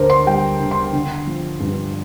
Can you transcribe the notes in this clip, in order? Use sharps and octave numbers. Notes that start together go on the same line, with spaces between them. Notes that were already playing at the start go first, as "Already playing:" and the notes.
Already playing: D2 D4 A#4 C5
C6
G3 G5
D3
C6
D3
F3
G2